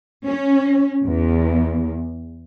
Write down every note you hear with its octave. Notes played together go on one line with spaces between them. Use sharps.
C#4
E2